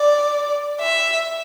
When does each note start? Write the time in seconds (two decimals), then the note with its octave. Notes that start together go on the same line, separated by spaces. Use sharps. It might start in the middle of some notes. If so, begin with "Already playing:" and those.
Already playing: D5
0.81 E5